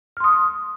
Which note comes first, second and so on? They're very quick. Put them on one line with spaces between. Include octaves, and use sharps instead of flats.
F6 C6 D#6